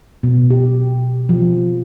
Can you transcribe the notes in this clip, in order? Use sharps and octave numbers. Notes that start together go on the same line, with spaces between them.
B2
G4
F3